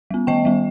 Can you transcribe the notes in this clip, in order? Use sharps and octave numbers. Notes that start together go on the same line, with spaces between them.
G3 B3
D#3 D#5 G5
G3 B3